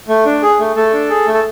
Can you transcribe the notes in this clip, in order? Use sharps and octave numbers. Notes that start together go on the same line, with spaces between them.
A3
D4
G#4
A3
A3 A4
D4
G#4
A3
A4